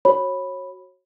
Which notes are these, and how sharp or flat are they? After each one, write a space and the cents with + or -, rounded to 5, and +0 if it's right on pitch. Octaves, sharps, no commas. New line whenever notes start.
F#4 +0 C#5 -30 B5 +0